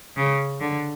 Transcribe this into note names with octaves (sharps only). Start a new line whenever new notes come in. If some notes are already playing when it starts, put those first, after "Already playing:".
C#3
D3